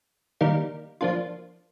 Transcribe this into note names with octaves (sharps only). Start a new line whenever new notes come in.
D#3 G3 A#3 D#4
F3 A#3 D4 F4